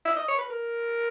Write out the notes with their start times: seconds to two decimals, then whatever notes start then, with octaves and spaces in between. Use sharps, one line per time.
0.05 E5
0.16 D#5
0.28 C#5
0.39 B4
0.50 A#4